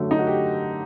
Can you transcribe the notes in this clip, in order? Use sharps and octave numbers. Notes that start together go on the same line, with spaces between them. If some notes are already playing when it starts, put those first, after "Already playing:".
Already playing: F#2 D3 F#3 A3
D#4
F#4
G4